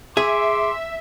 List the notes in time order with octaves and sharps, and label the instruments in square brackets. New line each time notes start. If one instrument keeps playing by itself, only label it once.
[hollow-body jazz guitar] G#4 [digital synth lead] E5 [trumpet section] C6 D6